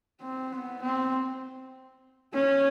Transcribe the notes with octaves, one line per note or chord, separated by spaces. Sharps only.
C4
B3
C4
C#4